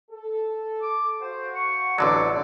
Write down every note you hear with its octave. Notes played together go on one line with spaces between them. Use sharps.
A4
D6
F#4 C5 F5 F#5
C#6
A1 D3 F#3 D5